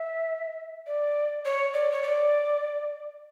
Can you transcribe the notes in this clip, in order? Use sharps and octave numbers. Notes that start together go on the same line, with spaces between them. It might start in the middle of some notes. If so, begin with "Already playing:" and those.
Already playing: E5
D5
C#5
D5
C#5
D5